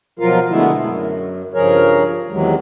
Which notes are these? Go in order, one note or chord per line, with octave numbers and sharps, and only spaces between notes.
B2 F3 F#3 F4 A#4 F5
B2 D3 G#3 A3 B3 E4
F#2
G2 C#3 F3 G#4 A#4 C#5
E2 C3 D#3 E3 F#3 G#3